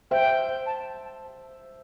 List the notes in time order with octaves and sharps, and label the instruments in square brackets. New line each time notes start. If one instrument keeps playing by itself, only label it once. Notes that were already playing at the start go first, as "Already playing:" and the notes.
[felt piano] C5 E5 [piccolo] G5
[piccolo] A5